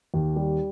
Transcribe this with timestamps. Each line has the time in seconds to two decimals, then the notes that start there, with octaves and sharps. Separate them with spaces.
0.14 D#2
0.36 G3